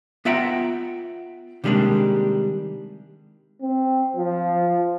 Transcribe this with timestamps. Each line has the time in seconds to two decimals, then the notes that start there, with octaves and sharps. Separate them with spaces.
0.25 B3 F4 E5 F#5 G5 A#5
1.64 C3 D#3 G3 G#3 A#3 D4
3.61 C4
4.16 F3